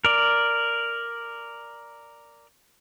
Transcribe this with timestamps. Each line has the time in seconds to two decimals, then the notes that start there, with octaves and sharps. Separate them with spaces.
0.05 A#4 D5